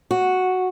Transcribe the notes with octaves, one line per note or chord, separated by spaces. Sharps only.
F#4